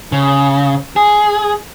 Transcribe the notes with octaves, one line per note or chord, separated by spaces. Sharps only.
C#3
G#4